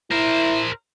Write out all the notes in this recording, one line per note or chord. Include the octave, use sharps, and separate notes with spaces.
E4 A#4 C5